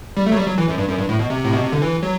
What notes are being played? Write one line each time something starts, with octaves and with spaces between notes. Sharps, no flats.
G3
A3
F#3
G3
F#3
E3
F#2
G2
F#2
G2
A2
B2
C3
A2
B2
C3
D3
E3
F#3